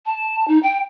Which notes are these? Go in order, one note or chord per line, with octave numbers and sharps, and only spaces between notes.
A5
D#4
G5